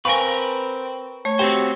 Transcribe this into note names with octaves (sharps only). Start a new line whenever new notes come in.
C4 A#4 B4 F5 G#5 C#6 D7
A3 C#5
C4 F#4 G4 C5